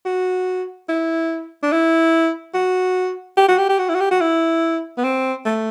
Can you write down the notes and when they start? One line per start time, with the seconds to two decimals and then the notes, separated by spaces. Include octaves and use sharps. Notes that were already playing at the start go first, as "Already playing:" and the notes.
0.06 F#4
0.89 E4
1.63 D4
1.72 E4
2.54 F#4
3.37 G4
3.48 F#4
3.58 G4
3.69 G4
3.79 F#4
3.89 E4
3.95 F#4
4.00 G4
4.11 F#4
4.21 E4
4.97 B3
5.04 C4
5.45 A3